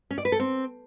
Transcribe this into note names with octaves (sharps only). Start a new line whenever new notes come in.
C#4
D5
B4
A4
C4